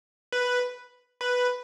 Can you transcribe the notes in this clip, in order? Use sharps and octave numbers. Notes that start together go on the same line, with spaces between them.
B4
B4